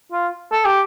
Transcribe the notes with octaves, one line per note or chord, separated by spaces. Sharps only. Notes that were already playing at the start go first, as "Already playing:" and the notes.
F4
A4
G4